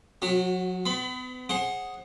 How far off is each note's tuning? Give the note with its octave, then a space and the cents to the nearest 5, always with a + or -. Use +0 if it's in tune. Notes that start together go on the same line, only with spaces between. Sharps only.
F#3 -35 F#4 +0
B3 +40 B5 +25
G#4 +0 C5 +35 F#5 +0